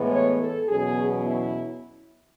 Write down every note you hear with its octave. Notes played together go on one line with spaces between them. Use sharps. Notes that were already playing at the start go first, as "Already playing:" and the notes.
Already playing: A2 E3 G#3 B3
C#5
A4
E2 B2 F#3 C#4 G#4
E4